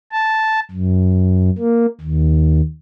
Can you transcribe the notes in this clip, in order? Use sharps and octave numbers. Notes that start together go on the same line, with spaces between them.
A5
F#2
A#3
D#2